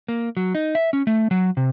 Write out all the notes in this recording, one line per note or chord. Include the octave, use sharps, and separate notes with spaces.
A#3
F#3
D#4
E5
C#4
A3
F#3
C3